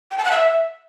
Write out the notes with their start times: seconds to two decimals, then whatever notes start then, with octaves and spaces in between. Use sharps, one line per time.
0.11 G5
0.18 A5
0.25 F#5
0.31 E5